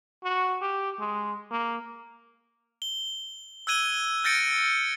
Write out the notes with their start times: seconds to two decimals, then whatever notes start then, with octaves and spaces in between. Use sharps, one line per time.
0.24 F#4
0.61 G4
1.00 G#3
1.51 A#3
2.82 G7
3.67 E6 F#6 G#6 D#7 G7
4.24 F6 G6 A6 A#6 C#7 D7